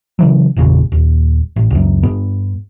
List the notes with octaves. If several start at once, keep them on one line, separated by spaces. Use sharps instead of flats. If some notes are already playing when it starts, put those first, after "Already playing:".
C#3 E3 F#3
G1 E2 A#2 C#3
D#1
A1
C#2 F#2
G2 B3